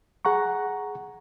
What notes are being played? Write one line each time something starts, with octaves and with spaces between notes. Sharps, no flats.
G#4 F#5 A#5 C#6